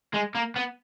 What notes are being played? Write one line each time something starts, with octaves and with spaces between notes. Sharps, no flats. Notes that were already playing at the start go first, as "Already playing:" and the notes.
G#3
A#3
B3